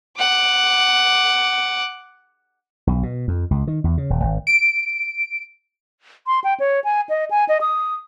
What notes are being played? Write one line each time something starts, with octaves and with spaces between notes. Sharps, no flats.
F#5 D6
B1
B2
F2
C#2
D#3
E2
C#3
D#1
G#1
D7
C6
G5
C#5
G#5
D#5
G#5
D#5
D#6